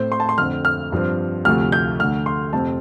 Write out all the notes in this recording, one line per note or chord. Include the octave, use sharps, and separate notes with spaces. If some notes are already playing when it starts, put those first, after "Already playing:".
Already playing: A2 A3 C4 C5
C6
A5
C6
F2 D3 A3 C4 F6
F6
G2 F3 C4
D2 C3 F3 A3 F6
G6
D2 D3 A3 F6
C6
F2 C3 A3 C4 A5